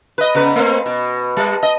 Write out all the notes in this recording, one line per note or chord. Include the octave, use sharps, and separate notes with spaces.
B4 D#5
C#3 B3 B4
A3 C4
B2
G3
D#5